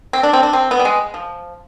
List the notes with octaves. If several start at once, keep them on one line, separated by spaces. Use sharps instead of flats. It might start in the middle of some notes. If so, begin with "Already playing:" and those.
C4
D4
C4
D4
C4
B3
G3
G#3
F3